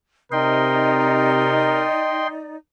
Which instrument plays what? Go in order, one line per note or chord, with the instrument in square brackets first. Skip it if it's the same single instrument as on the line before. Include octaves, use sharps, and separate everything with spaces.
[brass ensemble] C3 [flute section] D#4 D5 [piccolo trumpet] A#4 [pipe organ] D#5 G5 C6